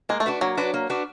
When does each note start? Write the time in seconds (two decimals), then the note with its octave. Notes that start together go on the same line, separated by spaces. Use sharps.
0.09 G#3 A#3
0.20 A3
0.26 D4 F#4 B4
0.41 F#3 A#3
0.57 D4 F#4 B4
0.74 A#3
0.90 D4 F#4 B4